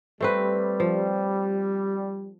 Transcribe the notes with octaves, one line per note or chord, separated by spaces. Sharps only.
G3 A3 C4 B4
F3